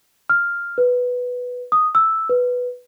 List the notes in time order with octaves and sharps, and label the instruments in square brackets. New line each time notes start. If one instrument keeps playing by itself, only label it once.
[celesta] F6
B4
D#6
E6
B4